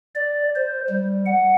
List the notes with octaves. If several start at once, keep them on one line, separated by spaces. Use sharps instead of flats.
D5
C5
G3
F#5